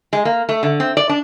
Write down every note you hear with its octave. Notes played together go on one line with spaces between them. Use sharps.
G#3
A#3
A3
D3
C4
D5
D4